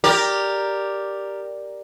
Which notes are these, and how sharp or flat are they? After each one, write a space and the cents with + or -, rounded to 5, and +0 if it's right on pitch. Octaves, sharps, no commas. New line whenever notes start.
G4 +0 A#4 +0 D5 +0